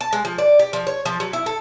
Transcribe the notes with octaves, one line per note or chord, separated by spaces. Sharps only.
A5
G#3
F3
D5
G4
F3
C#5
F3
F#3
E4
A4